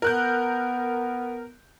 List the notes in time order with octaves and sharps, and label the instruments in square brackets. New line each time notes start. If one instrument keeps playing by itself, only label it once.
[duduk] B3 [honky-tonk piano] A#4 F#6 G6